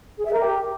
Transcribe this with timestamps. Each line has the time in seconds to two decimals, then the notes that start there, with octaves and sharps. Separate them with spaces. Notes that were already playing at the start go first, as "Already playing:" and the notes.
0.18 G#4
0.25 E5
0.33 A#4
0.40 G4